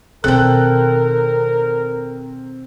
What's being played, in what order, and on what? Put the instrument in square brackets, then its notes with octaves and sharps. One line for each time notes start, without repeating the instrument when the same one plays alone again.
[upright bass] B2 D#3 [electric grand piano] C4 F#6 [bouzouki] A4 G5 [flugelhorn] A#4